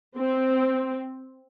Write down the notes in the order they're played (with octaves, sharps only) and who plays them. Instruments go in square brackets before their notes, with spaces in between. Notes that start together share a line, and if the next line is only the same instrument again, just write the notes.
[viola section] C4